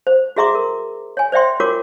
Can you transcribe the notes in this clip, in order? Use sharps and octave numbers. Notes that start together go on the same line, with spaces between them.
C5
F#4 G#4 E5 A#5 C6 D6
A#4
C#5 G#5
C5 D5 E5 G5 C6
F4 F#4 A#4 C#5 D6